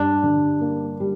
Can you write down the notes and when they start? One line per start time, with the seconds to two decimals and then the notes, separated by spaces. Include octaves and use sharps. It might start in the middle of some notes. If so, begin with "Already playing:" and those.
Already playing: G2 D4
0.23 D3
0.61 A#3
1.00 G3